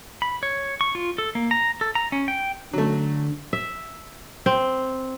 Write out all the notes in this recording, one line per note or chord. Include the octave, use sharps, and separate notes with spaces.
B5
C#5
C#6
F4
A4
A#3
A#5
A4
A#5
C#4
G5
D3 F#3 A3
E5
C4